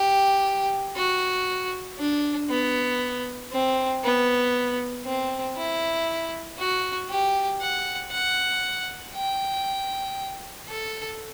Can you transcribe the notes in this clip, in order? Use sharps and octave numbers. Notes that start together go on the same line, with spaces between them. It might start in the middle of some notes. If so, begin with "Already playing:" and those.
Already playing: G4
F#4
D4
B3
C4
B3
C4
E4
F#4
G4
F#5
F#5
G5
A4